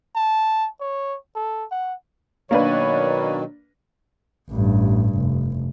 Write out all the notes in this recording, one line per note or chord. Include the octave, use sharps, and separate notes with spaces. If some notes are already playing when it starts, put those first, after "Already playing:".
A5
C#5
A4
F#5
B2 D#3 F#3 A#3 D4 B4 C#5
A1 G2
F1